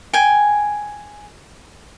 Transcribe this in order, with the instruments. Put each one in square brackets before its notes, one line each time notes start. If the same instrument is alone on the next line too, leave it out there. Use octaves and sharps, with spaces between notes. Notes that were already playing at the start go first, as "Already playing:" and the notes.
[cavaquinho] G5 G#5